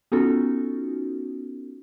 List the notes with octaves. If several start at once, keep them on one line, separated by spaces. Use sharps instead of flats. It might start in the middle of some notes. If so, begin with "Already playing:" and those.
B3 C#4 D#4 F4 F#4 A4